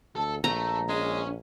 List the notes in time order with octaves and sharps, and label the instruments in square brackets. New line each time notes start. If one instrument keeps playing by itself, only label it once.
[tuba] D2 [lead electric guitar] A4
[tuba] A#1 [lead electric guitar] A3 [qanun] A#5
[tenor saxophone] G#3 [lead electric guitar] C#4